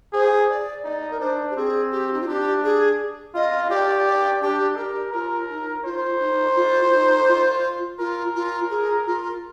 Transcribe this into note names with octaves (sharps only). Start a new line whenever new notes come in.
G#4 C5
D5
D#4 D5
A#4
D4 C5
G4
C4 G#4
G4
D#4
F4
D4 G4
G#4
F4 D#5
G4 D5
D5
D4 G4
G4 A#4
F4 A#4
D#4
F4 C5
D#4
F4
F4
D#4
F4
F4 A#4
F4
G#4
F4